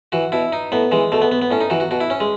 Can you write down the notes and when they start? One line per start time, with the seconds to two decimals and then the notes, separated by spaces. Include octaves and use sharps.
0.12 E3 F#4
0.32 B2 E4
0.52 D#4
0.72 A2 B3
0.91 E3 G#3
1.12 B2 A3
1.21 B3
1.32 B3
1.42 B3
1.51 A2 C#4
1.61 D#4
1.70 E3 F#4
1.80 F#4
1.91 B2 F#4
2.00 E4
2.10 C#4
2.20 G#3